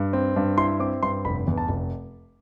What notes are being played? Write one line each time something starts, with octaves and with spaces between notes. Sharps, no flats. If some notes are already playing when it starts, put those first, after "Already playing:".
Already playing: G2
C4
G2
E4 C6
C4 D6
G2 C6
F1 B5
E2
A5
F1